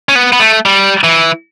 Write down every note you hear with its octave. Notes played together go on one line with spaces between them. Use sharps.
C#4
B3
B3
A3
G3
E3